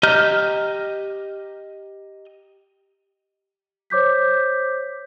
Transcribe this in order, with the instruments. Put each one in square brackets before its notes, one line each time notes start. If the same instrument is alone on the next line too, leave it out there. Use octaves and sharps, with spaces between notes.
[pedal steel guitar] G4 D#5 A#5 F6 G6
[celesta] C5 C#5 D6 G6 B6